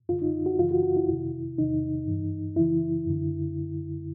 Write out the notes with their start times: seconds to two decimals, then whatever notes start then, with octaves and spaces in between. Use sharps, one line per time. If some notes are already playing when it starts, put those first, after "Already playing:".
0.09 F#2 D3 F4
0.22 D#4
0.46 F#4
0.59 F#2 C#3 E3 F4
0.71 F#4
0.83 F#4
0.97 E4
1.08 F2 C3 D#3
1.58 E2 C3 D#3 D#4
2.07 G2 E3
2.56 F#2 C#3 E3 E4
3.06 F#2 D3